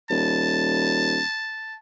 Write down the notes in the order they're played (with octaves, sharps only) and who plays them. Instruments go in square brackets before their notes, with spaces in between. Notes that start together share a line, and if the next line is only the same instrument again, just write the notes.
[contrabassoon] D#1 [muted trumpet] A5